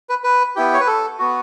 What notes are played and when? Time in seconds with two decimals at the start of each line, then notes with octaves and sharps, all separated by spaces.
0.09 B4
0.24 B4
0.56 B3 E4 G4
0.74 C#5
0.80 B4
0.87 A4
1.19 B3 F#4